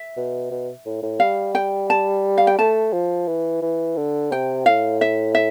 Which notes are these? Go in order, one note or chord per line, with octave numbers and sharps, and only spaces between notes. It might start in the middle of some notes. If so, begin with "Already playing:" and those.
Already playing: E5
B2
B2
A2
A2
G3 F5
G5
A5
F5
G5
A3 A5
F3
E3
E3
D3
C3 G5
A2 F5
E5
E5